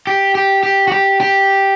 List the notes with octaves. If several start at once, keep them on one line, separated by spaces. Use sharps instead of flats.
G4
G4
G4
F#4
G4
G4